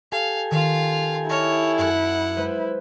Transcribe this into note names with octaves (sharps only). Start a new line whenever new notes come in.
G4 A4 F5 G#5
D#3 F4 F5
E4 C#5 D#5 A5 F6
F#2 F#5
G#3 B4 C5